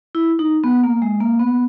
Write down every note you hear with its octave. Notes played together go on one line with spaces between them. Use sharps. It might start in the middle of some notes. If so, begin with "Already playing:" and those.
E4
D#4
B3
A#3
G#3
A#3
B3